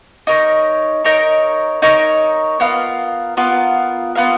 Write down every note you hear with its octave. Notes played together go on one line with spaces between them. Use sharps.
D#4 A#4 C#5
D#4 A#4 C#5
D#4 A#4 C#5
B3 F4 A#4 F5
B3 F4 A#4 F5
B3 F4 A#4 F5